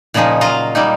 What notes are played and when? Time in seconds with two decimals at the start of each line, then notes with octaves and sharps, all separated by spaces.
0.14 A#2 C#3 F3 D#4 G#4
0.41 F#3 F4 D#5 F5 A#5
0.75 G3 A#3 D#4